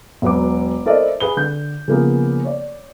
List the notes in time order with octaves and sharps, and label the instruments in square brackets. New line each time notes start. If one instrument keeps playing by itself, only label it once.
[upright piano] E1 F#3 B4 D6
E4 A4 A#4 C5 D5 D#5
G#4 B4 G7
D3 G6
C#3 F3 A#3 B3 G#4
C#5 D5